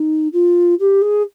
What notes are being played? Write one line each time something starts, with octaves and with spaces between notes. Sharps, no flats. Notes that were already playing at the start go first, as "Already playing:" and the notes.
Already playing: D#4
F4
G4
G#4